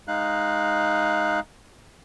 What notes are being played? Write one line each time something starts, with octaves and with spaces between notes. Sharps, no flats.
G#3 D#4 F5 F#6